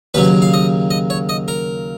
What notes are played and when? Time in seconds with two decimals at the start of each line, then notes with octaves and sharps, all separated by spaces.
0.14 D#2 C#3 F#3 B4
0.42 F5
0.53 D#5
0.91 D#5
1.10 C#5
1.29 D#5
1.48 A#4